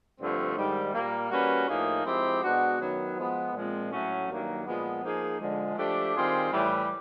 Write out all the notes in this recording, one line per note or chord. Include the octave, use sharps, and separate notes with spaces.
G2 D3 F3 A3 C4
G#2 D#3 G3
A#2 G3 A#3
G3 A#3 C#4 F#4 B4
A2 F3 A#3 D#4 G#4
F3 G#3 C4 E4 G4
B2 G#3 B3 D4 F#4
F#2 D#3 F#3 B3
F3 G#3 B3
A#2 F3 G#3 C4
A2 F#3 A3 C#4 F#4
G2 D#3 F#3 A#3
A#2 F3 G#3 B3
F3 A#3 D#4 G#4
D3 F3 G#3
F3 A3 D4 G4
D#3 G3 C4 F4 G#4
A2 E3 G3